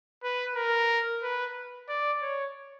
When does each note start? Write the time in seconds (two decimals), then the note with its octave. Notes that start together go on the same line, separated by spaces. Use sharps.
0.23 B4
0.55 A#4
1.23 B4
1.89 D5
2.22 C#5